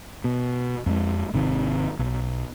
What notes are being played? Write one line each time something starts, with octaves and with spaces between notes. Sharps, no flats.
B2
F2 G#3
G#1 C3 D#3
B1